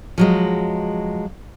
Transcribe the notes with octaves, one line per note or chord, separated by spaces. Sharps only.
F3 F#3 G#3